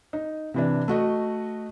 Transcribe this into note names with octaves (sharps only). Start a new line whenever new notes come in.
D#4
C3 E3 D4
A3 F#4 D#5